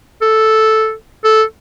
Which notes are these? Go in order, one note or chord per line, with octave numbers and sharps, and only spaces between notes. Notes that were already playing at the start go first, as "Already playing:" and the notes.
A4
A4